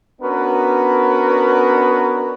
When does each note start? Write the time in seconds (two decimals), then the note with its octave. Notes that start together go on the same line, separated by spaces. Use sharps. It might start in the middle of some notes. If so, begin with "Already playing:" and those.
0.21 B3 C#4 D4 F#4 A#4 B4